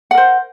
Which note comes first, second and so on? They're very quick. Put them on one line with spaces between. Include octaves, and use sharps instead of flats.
F#5 A#4 C5